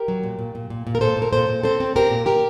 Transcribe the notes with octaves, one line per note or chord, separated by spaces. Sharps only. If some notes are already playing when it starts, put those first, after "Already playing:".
Already playing: G4 A#4
F#3
A#2
A#2
A#2
A#2
A#2
A#4
A#2 A4 C5
A#2 A#4
A#2 A4 C5
A#2
C4 A4 C5
C4
C4 G4 A#4
A#2
G4 A#4